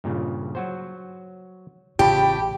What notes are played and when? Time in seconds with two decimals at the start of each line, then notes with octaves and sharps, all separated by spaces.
0.04 G2 A#2 C#3
0.55 F#3 F#4 C5
1.99 A1 A2 C#3 F4 G4 G5 A5 B5